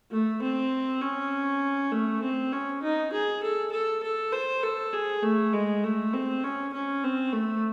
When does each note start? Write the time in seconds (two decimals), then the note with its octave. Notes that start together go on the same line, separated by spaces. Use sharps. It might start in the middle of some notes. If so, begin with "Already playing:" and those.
0.11 A3
0.42 C4
1.01 C#4
1.91 A3
2.23 C4
2.52 C#4
2.83 D#4
3.12 G#4
3.43 A4
3.72 A4
4.03 A4
4.32 C5
4.63 A4
4.92 G#4
5.22 A3
5.53 G#3
5.84 A3
6.13 C4
6.44 C#4
6.73 C#4
7.04 C4
7.33 A3